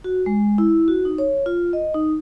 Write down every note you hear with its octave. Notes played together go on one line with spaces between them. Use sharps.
F#4
G#3
E4
F#4
D#4
C#5
F4
D#5
D#4